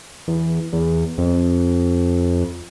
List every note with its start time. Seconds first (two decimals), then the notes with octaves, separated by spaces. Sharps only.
0.28 E2
0.73 E2
1.18 F2